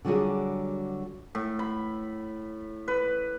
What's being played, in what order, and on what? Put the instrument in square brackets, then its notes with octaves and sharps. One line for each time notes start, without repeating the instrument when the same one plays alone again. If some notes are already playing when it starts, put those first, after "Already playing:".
[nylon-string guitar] D3 F#3 G3 F#4 G#4
[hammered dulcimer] A2
B5
B4